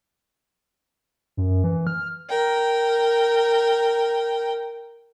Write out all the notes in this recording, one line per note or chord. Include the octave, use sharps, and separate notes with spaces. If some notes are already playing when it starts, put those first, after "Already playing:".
F#2
E3
F6
A#4 G5